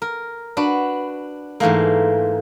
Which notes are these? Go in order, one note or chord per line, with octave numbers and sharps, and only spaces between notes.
A#4
D4 F#4 B4
G#2 E3 A3 A#3